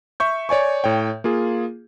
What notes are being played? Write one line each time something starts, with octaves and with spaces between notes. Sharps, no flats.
E5 C#6 G6
C#5 D5 G#5 C#6
A2 C#5 G5
A#3 F4 G#4